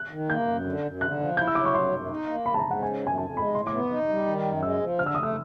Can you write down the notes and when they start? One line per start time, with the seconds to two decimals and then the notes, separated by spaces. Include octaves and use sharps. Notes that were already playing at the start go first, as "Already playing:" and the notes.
Already playing: F#6
0.11 D#3
0.29 A#3 G6
0.47 F#2
0.65 D3
0.84 F#2
1.01 D3 F#6
1.20 F3
1.37 E4 G6
1.47 E6
1.55 F#3 D6
1.65 C#6
1.75 F#2 C6
1.92 F#2
2.10 D#4
2.28 A#3
2.46 G#2 B5
2.54 A5
2.59 A#5
2.64 G#2
2.71 F#5
2.82 C#3 G#5
3.00 F#2
3.07 G#5
3.18 F2 A5
3.37 G#3 B5
3.54 A2 C6
3.67 D6
3.73 B3
3.91 D#4
4.09 G3
4.27 D#3
4.45 F#2
4.62 G#3 E6
4.81 F3
4.98 D3 F6
5.06 E6
5.14 D#6
5.17 A3
5.23 E6